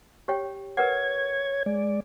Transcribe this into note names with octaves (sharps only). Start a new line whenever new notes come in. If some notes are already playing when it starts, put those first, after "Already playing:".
G4 C#5 G5
A#4 B4 C#5 F#5 G#6
G#3 D5